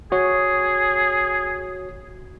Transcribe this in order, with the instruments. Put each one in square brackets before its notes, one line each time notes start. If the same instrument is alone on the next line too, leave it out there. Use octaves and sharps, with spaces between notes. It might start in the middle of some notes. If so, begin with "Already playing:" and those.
[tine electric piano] F#4 C#5 [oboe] G#4